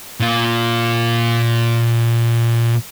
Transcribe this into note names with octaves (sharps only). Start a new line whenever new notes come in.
A#2 F4